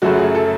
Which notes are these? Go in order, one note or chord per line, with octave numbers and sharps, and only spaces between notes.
F#2 C#3 F#3 A3 F#4
G#4
A4